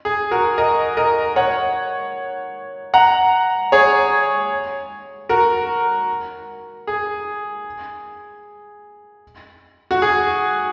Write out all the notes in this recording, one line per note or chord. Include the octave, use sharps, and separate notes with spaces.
G#4
F#4 A#4
A#4 D#5
A#4 D#5
C#5 F#5
F#5 A#5
G#4 C#5
F#4 A#4
G#4
F#4
G#4